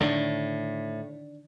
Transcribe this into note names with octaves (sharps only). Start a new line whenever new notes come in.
A2 D3 D#3 D4